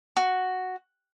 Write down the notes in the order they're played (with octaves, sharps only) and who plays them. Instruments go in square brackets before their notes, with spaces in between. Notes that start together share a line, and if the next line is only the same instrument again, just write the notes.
[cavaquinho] F#4